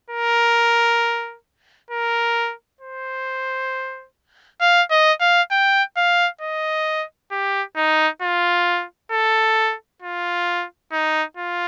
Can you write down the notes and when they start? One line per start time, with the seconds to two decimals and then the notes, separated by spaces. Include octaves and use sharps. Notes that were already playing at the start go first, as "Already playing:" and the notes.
0.11 A#4
1.91 A#4
2.81 C5
4.61 F5
4.91 D#5
5.21 F5
5.51 G5
5.97 F5
6.41 D#5
7.31 G4
7.77 D#4
8.22 F4
9.12 A4
10.02 F4
10.92 D#4
11.37 F4